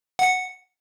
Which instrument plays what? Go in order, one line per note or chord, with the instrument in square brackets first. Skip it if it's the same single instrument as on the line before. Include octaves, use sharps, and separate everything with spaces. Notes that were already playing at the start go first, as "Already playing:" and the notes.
[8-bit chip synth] F#5 C#7